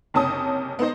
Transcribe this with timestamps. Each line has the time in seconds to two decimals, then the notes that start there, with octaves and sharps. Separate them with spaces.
0.14 F#1 C3 C#4 A5 D#6
0.79 B3 D#4 C5 D#5